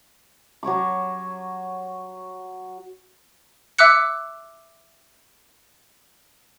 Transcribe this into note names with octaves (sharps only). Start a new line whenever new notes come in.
F#3 C#5 C#6 D6
E5 D6 E6 F#6 C#7